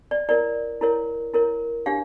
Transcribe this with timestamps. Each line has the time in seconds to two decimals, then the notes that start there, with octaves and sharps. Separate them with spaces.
0.11 D5
0.29 E4 A#4 C#5 D5
0.81 E4 A#4 C#5
1.34 E4 A#4 C#5
1.86 D4 G4 C#5 F5